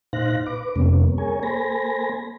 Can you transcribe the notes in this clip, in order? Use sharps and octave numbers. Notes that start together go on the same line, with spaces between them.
A#2 D#4 C5 F5 F#6 A#6
B4 D6
F2 C3 G3 A#3 B3 C#4
G#4 A#4 C#5 G#5
A#3 A4 C5 G#5 B5 A#6